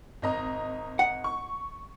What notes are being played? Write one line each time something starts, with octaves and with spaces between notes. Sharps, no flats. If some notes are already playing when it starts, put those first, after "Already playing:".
G#1 D#5 A#5
F#5
C#6